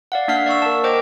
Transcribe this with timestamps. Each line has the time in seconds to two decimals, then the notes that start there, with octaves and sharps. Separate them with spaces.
0.12 D5 F5 F#5
0.28 A#3 D4 E5 F#5 F6 C7
0.46 D5 F5 C#6 E6
0.62 A#4 A5
0.84 A#4 C5 D#5 G5 D6 G6